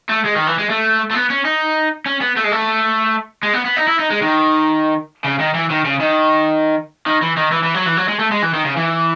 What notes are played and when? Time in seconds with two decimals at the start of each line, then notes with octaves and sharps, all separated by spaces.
0.09 A3
0.24 G#3
0.35 D#3
0.47 E3
0.58 G#3
0.69 A3
1.11 A3
1.15 B3
1.30 C#4
1.45 D#4
2.06 C#4
2.21 B3
2.36 A3
2.44 G#3
2.52 A3
3.43 G#3
3.53 B3
3.65 B3
3.76 D#4
3.87 E4
3.99 D#4
4.10 G#3
4.22 D#3
5.24 C#3
5.39 D#3
5.54 E3
5.70 D#3
5.85 C#3
6.00 D#3
7.06 D#3
7.22 E3
7.37 D#3
7.51 E3
7.63 E3
7.74 F#3
7.86 E3
7.97 F#3
8.08 G#3
8.19 A3
8.32 G#3
8.43 E3
8.54 D#3
8.65 C#3
8.77 E3